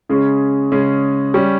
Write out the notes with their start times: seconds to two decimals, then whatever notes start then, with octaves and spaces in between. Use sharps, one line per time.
0.09 C#3 G#3 C#4
0.72 C#3 G#3 C#4
1.34 G3 C#4